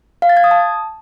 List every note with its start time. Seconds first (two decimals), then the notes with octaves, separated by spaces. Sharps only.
0.22 F5
0.29 A6
0.37 G#6
0.44 D#6
0.51 A5